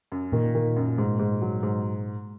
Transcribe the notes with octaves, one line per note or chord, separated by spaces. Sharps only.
F#2
A#2 D#3
D#3
F#2
G#2
G#2
F#3
G#2